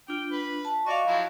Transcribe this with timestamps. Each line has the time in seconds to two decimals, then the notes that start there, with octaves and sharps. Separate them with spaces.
0.08 D4 F4 G5
0.31 B4
0.65 A5
0.86 F#4 D5 D#5 F5 C#6
1.06 F3 F#3 E4